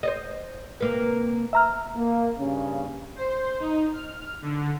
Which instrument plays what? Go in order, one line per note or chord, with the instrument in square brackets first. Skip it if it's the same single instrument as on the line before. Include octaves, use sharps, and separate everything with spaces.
[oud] C5 D5 D#5
C3 A#3 B4
[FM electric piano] E5 A#5 F6
[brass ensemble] A#3
G2 C#3 C#4
[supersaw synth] C5
D#4
F6
D3